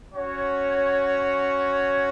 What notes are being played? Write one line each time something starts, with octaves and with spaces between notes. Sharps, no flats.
C#4 F#4 C#5